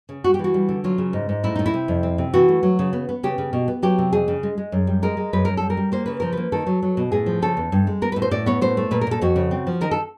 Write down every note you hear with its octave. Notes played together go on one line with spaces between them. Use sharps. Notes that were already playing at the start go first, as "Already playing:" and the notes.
C#3
G3 F#4
G4
E3
F#4
G3
D3
F#3 F4
C#3
G#2
G#2
A2 E4
A2 D#4
E4
C3
F2
C4
C3
E3 F#4
A3
F#3
C#3
B3
B3
C#3 G4
C#3
B2
B3
F#3 G4
C3
F2 G#4
C#3
G#3
G#3
F#2
G3
G#3 A#4
G#3
F#2 B4
F#2 A#4
G3 A4
A#4
G3
A#3 C5
C#3 B4
F3 A#4
A#3 B4
D#3 A4
F#3
F#3
B2
A2 G#4
F3
C#3 A4
E2
G2
G#3
B3 A#4
B4
A2
C5
A2 D5
B3 C#5
A2 C5
A3
A#2 B4
A#4
A#2 A4
F2 F#4
C#3
C4
F3
D#3 A#4
A4